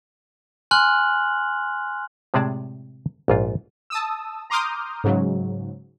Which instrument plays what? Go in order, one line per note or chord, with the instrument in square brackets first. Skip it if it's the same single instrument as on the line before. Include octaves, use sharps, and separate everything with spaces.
[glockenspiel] G#5 C6 F6 F#6 F#7
[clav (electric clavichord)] A2 C3 G#3 G#4 D5 A5
A#1 G#2 F4
[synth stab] A5 D#6 E6
A#5 C6 D6 D#6 F6 G6
G#2 C#3 F#3